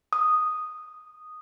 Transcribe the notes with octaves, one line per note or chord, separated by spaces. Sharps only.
D#6